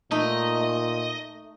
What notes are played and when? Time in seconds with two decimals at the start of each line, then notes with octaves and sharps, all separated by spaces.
0.11 A#2 A3 D#4 D#5